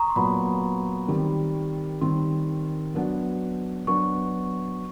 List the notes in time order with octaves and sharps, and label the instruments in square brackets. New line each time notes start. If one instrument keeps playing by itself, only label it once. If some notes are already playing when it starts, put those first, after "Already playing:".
Already playing: [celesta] A#5 C#6 D#6
C6
[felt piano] A#2 F#3 B3 [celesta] B5
[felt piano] D#3 G3 C4
[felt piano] D#3 G3 C4 [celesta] C6
[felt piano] F#3 B3 D4 F#4
[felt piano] F#3 B3 D4 F#4 [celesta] C#6